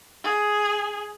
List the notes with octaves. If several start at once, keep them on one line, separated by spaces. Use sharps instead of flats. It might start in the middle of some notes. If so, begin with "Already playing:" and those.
G#4